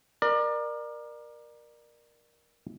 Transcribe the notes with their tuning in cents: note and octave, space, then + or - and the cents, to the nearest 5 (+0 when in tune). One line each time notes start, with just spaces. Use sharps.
A#4 +15 D5 +30